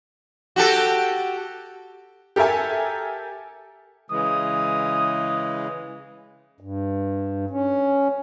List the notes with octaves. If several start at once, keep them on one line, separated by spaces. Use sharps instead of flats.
F#4 G4 A4
G4 A4 A#4 E5 G#5
C#3 E3 G#3 D#6
G2
C#4